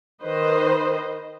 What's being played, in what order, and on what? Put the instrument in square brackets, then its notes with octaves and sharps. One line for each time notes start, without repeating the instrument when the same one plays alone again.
[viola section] D#3 B4 C5 D#5